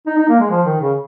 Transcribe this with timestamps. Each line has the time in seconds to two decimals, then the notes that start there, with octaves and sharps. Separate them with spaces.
0.06 D#4
0.18 D#4
0.29 A#3
0.40 G#3
0.50 F3
0.65 D#3
0.81 C#3